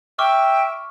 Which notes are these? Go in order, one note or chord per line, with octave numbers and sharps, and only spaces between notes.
E5 G5 C#6 D6 F6